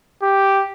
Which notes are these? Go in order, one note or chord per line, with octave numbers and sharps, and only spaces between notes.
G4